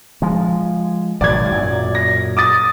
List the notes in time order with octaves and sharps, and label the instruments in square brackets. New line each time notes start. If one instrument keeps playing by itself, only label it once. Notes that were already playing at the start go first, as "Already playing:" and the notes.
[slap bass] F3 G#3
[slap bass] G#1 B2 F#3 [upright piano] D5 G#6
[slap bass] F#2 A#2
[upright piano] A#6
D6 D#6 A6